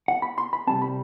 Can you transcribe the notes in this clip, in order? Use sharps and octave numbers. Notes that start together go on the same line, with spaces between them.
F#5
B5
C6
B5
C2 C3 G3 C4 A5
B5